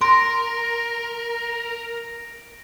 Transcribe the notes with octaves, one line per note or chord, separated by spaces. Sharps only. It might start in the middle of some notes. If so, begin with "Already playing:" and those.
A#4 C6 A#6 D7